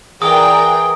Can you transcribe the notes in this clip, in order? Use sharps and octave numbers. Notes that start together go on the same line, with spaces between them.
E3 G#4 A#4 D5 G5 D#6